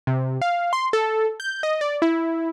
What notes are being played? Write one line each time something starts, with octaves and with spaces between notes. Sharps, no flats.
C3
F5
C6
A4
G6
D#5
D5
E4